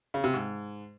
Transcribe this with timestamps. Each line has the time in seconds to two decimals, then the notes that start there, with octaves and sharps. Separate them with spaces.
0.14 C#3
0.24 C3
0.33 G#2